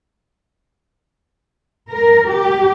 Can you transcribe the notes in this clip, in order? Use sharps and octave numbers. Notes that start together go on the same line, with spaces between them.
A#4
G4